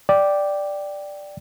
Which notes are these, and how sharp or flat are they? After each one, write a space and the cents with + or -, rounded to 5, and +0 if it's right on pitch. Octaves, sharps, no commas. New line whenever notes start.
D5 +0 G5 -5 D6 +0